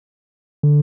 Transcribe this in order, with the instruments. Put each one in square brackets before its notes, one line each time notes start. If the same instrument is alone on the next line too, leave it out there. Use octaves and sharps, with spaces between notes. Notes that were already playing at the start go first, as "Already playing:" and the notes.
[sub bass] D3